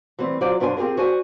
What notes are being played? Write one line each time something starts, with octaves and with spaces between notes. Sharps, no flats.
E3 G3 A3 C4
F#3 F4 C5 D5
F#2 D4 C5 G5 G#5
C4 F4 G4 G#4 A#4
F#4 C5 D5 G#5